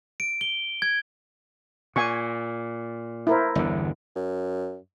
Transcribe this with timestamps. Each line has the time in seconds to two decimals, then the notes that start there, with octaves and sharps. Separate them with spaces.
0.20 D7
0.41 G7
0.82 G#6
1.96 A#2 G#5 C#6
3.27 E4 A#4 C5
3.55 G1 E2 D3
4.16 F#2